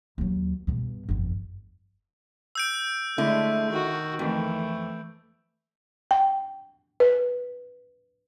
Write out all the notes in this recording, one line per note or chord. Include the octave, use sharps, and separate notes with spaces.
D#2 F#3
G2 B2
G1 F2
E6 G6 D7
D3 G#3 A3 E4
D#3 F#4
F2 E3 A3
G5
B4